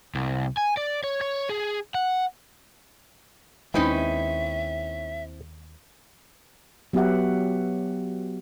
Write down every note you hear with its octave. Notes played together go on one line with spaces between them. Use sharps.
C2
G#5
D5
C#5
C#5
G#4
F#5
D#2 G#3 C4 C#4 D#4 E4 B4 E5
F#3 B3 F#4 G4 E5 F#5